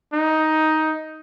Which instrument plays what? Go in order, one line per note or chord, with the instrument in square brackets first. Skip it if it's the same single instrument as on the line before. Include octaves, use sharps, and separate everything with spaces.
[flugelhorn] D#4